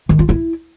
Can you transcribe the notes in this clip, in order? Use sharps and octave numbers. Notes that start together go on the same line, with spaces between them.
D#3
F4
E4